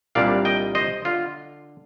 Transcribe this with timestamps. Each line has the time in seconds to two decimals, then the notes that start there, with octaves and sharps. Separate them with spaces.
0.15 C2 A#2 G3 D4 D5 F5
0.45 D#5 G5
0.75 C5 D#5
1.05 D3 F4